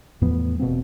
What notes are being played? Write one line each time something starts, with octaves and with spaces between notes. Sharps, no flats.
E2 A2 F3 B3
E1 B2 A#3 C4